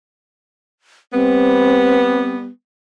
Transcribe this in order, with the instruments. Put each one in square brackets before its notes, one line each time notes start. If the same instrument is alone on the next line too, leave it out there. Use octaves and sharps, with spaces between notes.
[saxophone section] G3 B3 [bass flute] C4